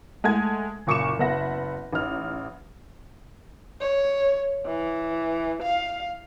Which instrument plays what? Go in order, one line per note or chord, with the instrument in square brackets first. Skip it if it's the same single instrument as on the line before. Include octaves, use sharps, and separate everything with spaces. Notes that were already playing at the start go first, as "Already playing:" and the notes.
[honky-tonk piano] G#3 A3 F#5 G#5 G#6
F#1 A#2 C#6 D6 C#7 E7
F#1 B3 B4 E5 F#5 A#6
A1 D#4 F6
[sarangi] C#5
E3
F5